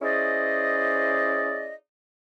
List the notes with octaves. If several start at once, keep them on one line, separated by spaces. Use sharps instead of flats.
C#4 E4 G#4 C5 D5 D#5